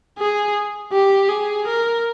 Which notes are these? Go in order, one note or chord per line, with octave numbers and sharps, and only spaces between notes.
G#4
G4
G#4
A#4